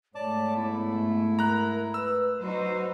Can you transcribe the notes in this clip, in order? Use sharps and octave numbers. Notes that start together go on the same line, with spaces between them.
G#2 A3 C#5 D5 A5 D6
B3 E4
A#4 A#5 F#6
B4 E6
F#3 D#4 F#4 B4 C5